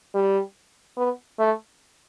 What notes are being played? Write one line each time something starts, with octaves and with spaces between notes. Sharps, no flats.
G3
B3
A3